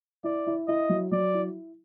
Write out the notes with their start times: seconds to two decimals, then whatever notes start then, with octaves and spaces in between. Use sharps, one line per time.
0.24 E4 D5
0.47 E4
0.67 E4 D#5
0.89 F#3
1.12 F#3 D5
1.34 E4